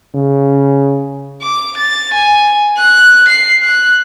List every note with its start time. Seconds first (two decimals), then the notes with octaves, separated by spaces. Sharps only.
0.15 C#3
1.42 D6
1.77 A6
2.13 G#5
2.78 F#6
3.28 C7
3.63 F#6